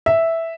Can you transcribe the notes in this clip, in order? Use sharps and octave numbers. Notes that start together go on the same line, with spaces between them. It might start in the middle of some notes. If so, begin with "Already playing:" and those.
E5